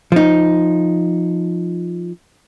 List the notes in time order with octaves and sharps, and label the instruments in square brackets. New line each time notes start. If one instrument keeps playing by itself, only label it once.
[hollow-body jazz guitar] F3 D#4